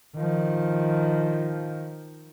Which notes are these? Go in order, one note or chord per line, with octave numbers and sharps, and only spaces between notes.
D#3 F3